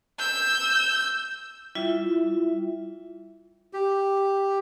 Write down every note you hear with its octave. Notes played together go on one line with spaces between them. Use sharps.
E6 G6
G3 E4 F4 E5
G4